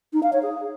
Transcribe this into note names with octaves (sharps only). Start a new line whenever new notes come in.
D#4
F5
C#5
G#4